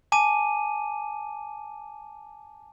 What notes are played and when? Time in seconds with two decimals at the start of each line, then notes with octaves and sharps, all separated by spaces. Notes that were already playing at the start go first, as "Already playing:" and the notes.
0.12 G#5 A5 D6 D#7